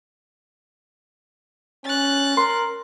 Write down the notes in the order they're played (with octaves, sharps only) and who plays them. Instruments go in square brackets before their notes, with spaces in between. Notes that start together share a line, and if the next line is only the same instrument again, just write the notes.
[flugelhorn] C#4 [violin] F#6 A6
[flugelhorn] A#4 [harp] C6